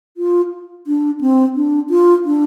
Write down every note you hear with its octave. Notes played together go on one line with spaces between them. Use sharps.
F4
D4
C4
D4
F4
D4